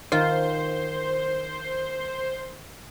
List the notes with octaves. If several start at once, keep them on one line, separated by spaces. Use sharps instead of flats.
D#3 F4 C5